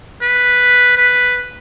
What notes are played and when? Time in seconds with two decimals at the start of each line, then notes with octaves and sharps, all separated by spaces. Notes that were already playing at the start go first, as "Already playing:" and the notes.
0.22 B4
0.97 B4